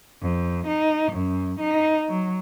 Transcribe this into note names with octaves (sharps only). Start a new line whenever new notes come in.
F2
D#4
F#2
D#4
F#3